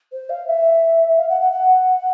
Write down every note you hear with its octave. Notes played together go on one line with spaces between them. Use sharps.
C5
F5
E5
F5
F#5
F#5
F#5